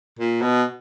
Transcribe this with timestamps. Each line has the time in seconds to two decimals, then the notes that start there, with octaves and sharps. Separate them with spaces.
0.19 A#2
0.42 B2